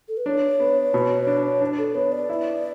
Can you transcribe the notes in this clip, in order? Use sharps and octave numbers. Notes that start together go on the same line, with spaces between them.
A4
B4
D4 C#5
B3
B2
D4
D4
A4
B3 C#5
D5
E4